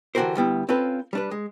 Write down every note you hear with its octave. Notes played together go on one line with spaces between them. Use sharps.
D3 E3 F#4 G4 A#4 C5
D2 G3 B3 E4
C4 C#4 F4 A4 B4
G3 D4 B4
G#3